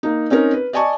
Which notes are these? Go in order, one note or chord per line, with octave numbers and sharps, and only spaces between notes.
A#3 D#4
C4 C#4 D#4 A#4
B4
D5 D#5 G#5 A5 C#6